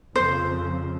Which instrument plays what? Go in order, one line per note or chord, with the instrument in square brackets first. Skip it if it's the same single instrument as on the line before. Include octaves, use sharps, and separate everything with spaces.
[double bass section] F2 C#3 [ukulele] C5